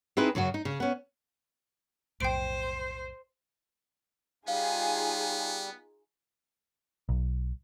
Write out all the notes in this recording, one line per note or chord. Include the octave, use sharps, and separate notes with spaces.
C4 D#4 E4 G#4 B4
F#2 C#3 F#3 F#4
D#4
C#3
B3 C#4
B1 F2 A2 C5 G5 D7
G3 B3 D#4 F4 G#4 F5
B1